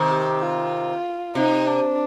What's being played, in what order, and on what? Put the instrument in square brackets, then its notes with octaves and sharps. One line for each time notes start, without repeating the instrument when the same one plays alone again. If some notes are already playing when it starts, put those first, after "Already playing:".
Already playing: [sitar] C3 D#3
[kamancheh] G4
F4
[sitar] C3 [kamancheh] D#4
[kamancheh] D4